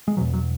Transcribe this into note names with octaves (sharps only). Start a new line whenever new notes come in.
G#3
E2 B2 F#3
F#3